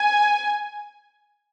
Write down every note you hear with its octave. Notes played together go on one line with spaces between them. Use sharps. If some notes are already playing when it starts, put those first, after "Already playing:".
Already playing: G#5